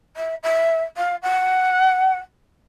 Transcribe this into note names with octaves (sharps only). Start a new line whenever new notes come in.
E5
E5
F5
F#5